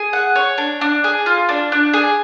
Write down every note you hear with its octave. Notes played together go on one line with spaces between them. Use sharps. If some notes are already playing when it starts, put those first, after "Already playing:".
Already playing: G#4
F#5
C#5
D4
D4
G#4
F4
D4
D4
G#4